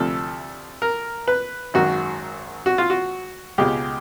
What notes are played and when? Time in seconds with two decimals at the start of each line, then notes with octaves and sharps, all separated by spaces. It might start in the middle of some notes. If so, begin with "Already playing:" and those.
Already playing: D2 C3 F3 A3 A4
0.82 A#4
1.28 B4
1.74 G#1 F#2 D#3 F#4
2.66 F#4
2.78 F4
2.90 F#4
3.58 C#2 B2 G#3 G4